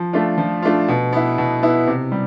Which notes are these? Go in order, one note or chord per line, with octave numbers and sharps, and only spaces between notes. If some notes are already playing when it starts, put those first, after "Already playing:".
Already playing: F3
A3 D4 F4
F3
A3 D4 F4
B2
B3 E4
B2
B3 E4
C3
G3